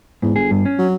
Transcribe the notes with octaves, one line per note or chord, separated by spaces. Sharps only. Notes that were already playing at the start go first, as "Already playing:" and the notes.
E2 G#2
G1 G#4
G2
C#4
F#3